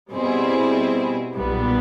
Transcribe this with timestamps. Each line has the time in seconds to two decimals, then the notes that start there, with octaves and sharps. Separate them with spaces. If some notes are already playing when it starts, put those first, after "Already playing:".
0.11 B2 G3 C4 E4 G#4
1.34 B1 A#2 G3 B3